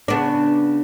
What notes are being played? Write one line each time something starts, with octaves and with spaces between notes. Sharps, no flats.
C#3 B3 D4